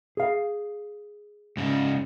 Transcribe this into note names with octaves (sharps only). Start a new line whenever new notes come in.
G#4 F5
G#2 C#3